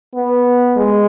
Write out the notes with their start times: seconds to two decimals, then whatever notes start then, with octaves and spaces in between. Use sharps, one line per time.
0.15 B3
0.76 G#3